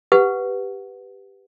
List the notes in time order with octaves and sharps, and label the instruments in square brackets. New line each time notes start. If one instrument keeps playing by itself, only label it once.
[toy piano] G4 B4 F#5